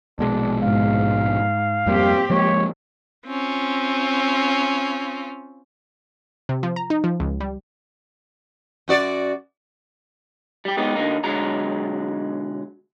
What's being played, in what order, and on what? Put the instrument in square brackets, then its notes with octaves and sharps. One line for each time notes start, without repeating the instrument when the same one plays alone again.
[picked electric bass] A#1 B2 G#3 [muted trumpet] D4
[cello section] G#2 [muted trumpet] F5
[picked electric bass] F2 G3 A#3 [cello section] C4 G4
[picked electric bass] F3 G#3 A#3 [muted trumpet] C#5
[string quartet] C4 C#4 F4
[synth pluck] C3
F3
A#5
D#4
F3
C#2
G3
[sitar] F#2 F#4 D5
[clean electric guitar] G3 G4
G#3 B3 D#4 G4
D3 A#3 D#4
B1 D3 F#3 G#3 A#5